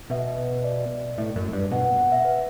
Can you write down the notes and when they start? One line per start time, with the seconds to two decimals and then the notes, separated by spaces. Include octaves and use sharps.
0.10 B2 E5
0.64 D5
1.18 A2
1.36 F#2
1.53 G2
1.71 B2 F#5
1.85 F#5
1.98 F#5
2.12 E5
2.25 B4